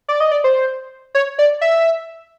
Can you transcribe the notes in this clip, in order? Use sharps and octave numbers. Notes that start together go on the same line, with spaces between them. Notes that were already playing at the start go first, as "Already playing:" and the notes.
D5
D#5
D5
C5
C#5
D5
E5